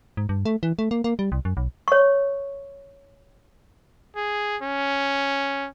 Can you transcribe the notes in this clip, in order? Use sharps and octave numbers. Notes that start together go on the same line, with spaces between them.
G#2
G2
A3
E3
A3
A#3
A#3
G3
C2
F#2
B1
C#5 C#6
G#4
C#4